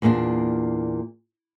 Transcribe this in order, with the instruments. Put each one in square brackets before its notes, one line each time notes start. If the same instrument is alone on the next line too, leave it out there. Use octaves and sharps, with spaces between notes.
[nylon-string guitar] E2 A#2 A#3 C#4 D4